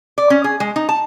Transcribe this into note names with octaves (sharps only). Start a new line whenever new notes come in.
D5
C#4
G#4
G#3
D#4
A5